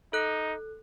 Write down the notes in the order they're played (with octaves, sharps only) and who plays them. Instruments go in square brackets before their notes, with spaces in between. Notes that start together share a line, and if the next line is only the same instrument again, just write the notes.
[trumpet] D#4 [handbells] A4 F#6